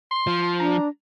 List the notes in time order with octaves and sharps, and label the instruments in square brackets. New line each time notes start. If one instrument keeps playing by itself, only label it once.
[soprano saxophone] C6
[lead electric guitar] F3
[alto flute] D4 [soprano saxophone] A#5